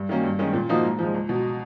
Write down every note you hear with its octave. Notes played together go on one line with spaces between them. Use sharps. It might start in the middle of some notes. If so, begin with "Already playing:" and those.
Already playing: G2
D#3 F#3 A#3 C#4
G2
D#3 G#3 C#4
A#2
F3 A#3 D#4 F#4
G#2
F3 G#3
C#2
B2 F#3